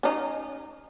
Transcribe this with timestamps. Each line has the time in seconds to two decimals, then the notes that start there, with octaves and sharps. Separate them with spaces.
0.03 C#4 D#4